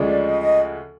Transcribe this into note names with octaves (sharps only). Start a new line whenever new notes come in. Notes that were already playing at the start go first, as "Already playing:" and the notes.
Already playing: D2 C#3 F3 G#3 D5
D#5
D#5